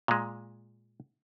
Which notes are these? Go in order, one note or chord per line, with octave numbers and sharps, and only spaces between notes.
A#2 G#3